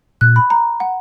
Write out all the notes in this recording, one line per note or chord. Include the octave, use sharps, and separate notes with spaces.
A#2 F#6
B5
A#5
F#5